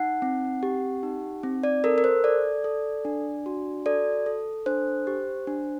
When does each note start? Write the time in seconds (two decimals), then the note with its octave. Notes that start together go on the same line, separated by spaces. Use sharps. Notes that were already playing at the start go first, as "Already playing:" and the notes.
Already playing: D#4 F#5
0.22 C4
0.63 G4
1.03 D#4
1.43 C4
1.63 D5
1.84 A4 A#4
1.98 A#4
2.04 C5
2.24 A4 D5
2.64 A4
3.05 D4
3.46 F#4
3.86 A4 D5
4.26 A4
4.66 D4 C5
5.07 G4
5.47 D4